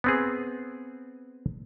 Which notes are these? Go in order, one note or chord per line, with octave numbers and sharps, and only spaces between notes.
B3 C4 G#4